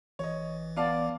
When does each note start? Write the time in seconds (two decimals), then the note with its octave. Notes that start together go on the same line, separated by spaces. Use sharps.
0.19 A1 E3 C#5 D#5
0.76 B3 D5 F5 A5